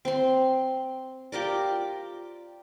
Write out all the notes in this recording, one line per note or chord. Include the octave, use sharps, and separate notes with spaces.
C4 C6
F4 G4 A#4 D5